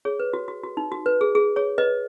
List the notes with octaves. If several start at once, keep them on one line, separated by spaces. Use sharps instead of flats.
G#4 C#5
B4
F#4
F#4
F#4
D#4
F#4
B4
G#4
G#4
G#4 C#5
B4 D#5